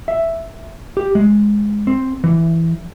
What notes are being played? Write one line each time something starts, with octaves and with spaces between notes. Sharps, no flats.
E5
G4
G#3
C4
E3